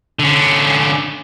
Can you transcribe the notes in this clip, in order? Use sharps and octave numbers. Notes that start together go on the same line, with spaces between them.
D3 C#4